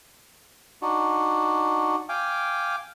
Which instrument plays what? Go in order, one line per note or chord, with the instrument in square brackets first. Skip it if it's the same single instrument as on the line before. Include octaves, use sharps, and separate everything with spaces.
[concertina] D4 D#4 F#4
F5 G5 G#5 D6